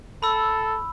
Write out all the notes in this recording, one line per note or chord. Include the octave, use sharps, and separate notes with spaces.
A4 B5 E6